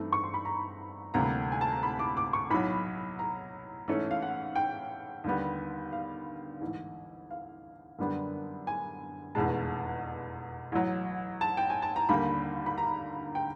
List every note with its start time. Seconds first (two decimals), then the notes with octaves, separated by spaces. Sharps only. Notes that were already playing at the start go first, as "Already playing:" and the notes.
Already playing: G2 E3 A3 C4 D#4
0.12 C#6
0.24 C6
0.34 B5
0.45 A#5
1.14 D2 C3 E3 G3 A#3 A#5
1.52 G#5
1.61 A5
1.72 A#5
1.83 B5
1.99 D6
2.17 D6
2.33 C#6
2.50 B1 A2 F#3 B5
3.19 A#5
3.88 G#2 E3 A3 C#4
4.11 F5
4.22 F#5
4.56 G5
5.24 D#2 D3 G3 B3
5.92 F5
6.61 A1 G#2 E3
7.30 F5
7.99 F#2 D3 G3 B3 D4
8.67 G#5
9.35 F1 E2 B2 G#3 A5
10.72 A1 A2 F#3
11.41 A5
11.57 G5
11.70 G#5
11.82 A5
11.96 A#5
12.09 D#2 D3 G3 A#3 B5
12.66 B5
12.78 A#5
13.35 G5